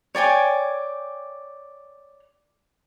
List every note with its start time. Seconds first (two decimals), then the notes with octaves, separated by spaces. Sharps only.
0.15 C#5 D5 G5 G#5